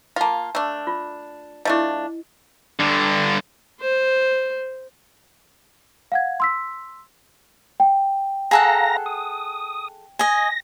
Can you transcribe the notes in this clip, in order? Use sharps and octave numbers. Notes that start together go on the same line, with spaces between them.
A#3 F4 F5 A5
A3 D4 E6
F4
F3 A3 D4 E4 D#5
G2 D3
C5
F5 F#5 G#6
C6 E6 B6
G5
G#4 A4 F5 F#5 A#5 A#6
D#6
D#5 G#5 A#6